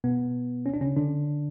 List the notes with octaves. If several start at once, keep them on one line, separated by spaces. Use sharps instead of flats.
B2 B3
C#4
D4
C#3 C#4
D3 D4